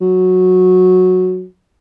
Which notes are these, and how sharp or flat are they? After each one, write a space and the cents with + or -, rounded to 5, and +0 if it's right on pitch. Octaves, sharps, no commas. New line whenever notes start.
F#3 -10